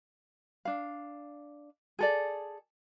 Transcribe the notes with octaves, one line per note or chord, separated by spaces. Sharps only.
D4 F5
G#4 A4 D5